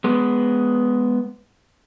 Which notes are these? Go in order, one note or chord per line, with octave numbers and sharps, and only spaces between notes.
G#3 B3